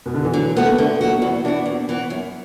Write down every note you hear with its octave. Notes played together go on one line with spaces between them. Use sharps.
B2
D3
E3
D3 F#3
A3 B3 F#4
B3
D3 A3
F#3 B3 F#4
F#4
E2 E4
E3 B3 D4 F#4
E2
E3 B3 F#4
F#2